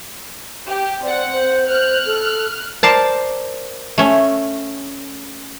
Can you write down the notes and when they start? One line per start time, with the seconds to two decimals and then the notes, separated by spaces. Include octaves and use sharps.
0.66 G4
1.03 C4 D5 F#5
1.32 C5
1.69 C5 F6 F#6
2.06 A4
2.83 A#4 C5 D5 A5
3.98 A3 C#4